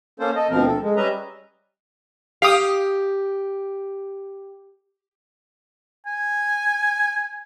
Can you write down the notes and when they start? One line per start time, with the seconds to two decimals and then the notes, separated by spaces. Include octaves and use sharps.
0.20 A#3 C#4 A4 C5
0.36 A4 D#5
0.50 D2 B2 F3 C4 A#4
0.67 A4
0.82 G#3
0.97 G3 C#4 B4 D#5 E5 A#5
2.42 G4 F5 D#6
6.06 G#5